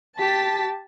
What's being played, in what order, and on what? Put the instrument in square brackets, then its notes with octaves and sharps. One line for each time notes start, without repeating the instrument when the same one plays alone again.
[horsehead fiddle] G4 [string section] A5 A6 B6